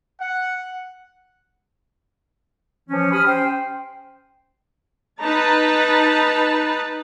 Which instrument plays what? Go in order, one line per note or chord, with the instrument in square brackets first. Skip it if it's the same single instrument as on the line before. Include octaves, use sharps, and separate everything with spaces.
[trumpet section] F#5
[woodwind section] E3 F3 C#4
[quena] G4 [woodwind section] B5 D#6 F6
[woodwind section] C#4 C5 [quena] G5
[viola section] D#4 B4 A5 A#5